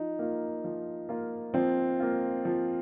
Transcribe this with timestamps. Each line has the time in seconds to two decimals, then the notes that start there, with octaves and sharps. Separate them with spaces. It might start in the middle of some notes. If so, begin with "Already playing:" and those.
Already playing: F3 D#4
0.19 A#3 F4
0.64 F3
1.09 A#3 F4
1.54 F3 C4
2.00 A#3 F4
2.45 F3